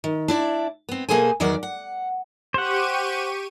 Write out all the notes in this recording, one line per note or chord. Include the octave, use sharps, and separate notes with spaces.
D#3
D4 E4 D5
B3 C4
B2 A#3 G#4 A4 C5 G#5
E2 D#3 F#3 A#4 D5 F#5
F#5
G4 C5 F#5 C#6 D#7